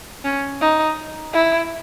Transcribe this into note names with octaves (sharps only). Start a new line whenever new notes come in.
C#4
D#4
E4